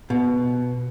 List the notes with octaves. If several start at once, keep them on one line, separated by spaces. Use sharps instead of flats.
B2